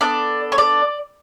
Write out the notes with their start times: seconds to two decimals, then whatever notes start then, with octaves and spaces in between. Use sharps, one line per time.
0.01 B3 D4 A4 D5
0.52 C#5
0.58 D5